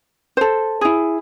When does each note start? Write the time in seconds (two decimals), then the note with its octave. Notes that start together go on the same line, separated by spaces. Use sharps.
0.37 A4 C5
0.81 E4 G#4